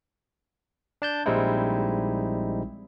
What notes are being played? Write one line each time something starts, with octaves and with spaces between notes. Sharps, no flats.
D4 A5 G6
A#1 G3 G#3 C4 D#4 E4